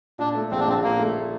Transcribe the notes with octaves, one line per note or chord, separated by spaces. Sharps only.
A#2 D4
A3
A#1 C4
D4
A#1 C4
A#2 A#3
A3